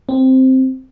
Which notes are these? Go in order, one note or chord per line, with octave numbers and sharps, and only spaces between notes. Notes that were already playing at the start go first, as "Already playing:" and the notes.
C4